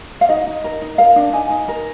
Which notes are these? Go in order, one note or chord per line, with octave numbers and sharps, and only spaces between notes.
F5
D#4 D#5
D#4
A#4
D#4
A#4 F5
D4
D#4 G#5
D#4
A#4